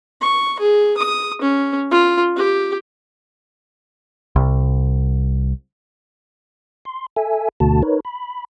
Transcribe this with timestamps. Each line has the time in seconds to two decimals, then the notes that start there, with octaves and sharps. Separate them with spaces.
0.21 C#6
0.59 G#4
0.97 D#6
1.42 C#4
1.91 F4
2.37 G4
4.36 C2
6.85 C6
7.16 A4 E5 G#5
7.60 D2 B2 D3 A3 F#4 A5
7.83 D#4 A#4 B4 C#5
8.05 B5